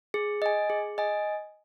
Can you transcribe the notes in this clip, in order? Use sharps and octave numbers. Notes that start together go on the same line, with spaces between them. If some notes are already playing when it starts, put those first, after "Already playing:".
G#4
D#5 G#5
G#4
D#5 G#5